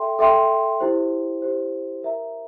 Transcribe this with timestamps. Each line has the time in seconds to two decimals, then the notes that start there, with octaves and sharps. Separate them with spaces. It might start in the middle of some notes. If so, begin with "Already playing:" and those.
Already playing: A4 E5 G5 C6
0.19 A4 E5 G5 C6
0.80 E4 G4 C5
1.42 E4 G4 C5
2.03 A#4 E5 A#5